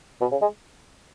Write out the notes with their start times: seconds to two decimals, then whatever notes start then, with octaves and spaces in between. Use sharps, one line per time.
0.21 B2
0.32 C#3
0.42 G#3